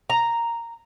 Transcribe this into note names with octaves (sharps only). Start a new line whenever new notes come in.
A#5